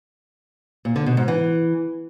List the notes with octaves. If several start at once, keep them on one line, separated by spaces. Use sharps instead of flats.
A#2
D3
B2
G#2
E3